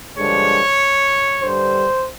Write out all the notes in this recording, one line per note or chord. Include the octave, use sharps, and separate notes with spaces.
G2 D3 F3 G#3 C#5
G2 D3 G3 C5